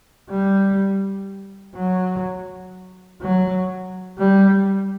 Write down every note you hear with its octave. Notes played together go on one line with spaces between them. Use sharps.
G3
F#3
F#3
G3